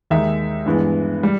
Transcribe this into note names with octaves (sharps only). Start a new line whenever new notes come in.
D#2 D#3 G#3 D#4 E5
G2 E3 G#3 B3
G3